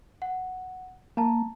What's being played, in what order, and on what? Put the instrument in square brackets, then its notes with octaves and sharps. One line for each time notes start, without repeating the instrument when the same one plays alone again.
[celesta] F#5
[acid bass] A#3 [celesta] A5 A#5